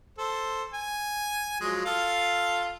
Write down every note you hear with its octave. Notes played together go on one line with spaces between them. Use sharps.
A4 C5
G#5
F3 F#3 G#3
F4 A4 F5